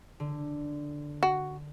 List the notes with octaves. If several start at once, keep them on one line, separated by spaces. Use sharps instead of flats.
D3
F#4